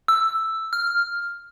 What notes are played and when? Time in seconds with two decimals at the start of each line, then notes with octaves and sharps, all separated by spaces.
0.08 E6
0.73 F6